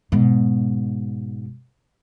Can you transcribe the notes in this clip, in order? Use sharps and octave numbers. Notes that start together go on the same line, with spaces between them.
G#2 B2